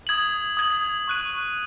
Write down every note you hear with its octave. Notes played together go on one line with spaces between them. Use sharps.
D#6 G#6 F#7
D#6 G#6 F#7
C#6 F#6 D#7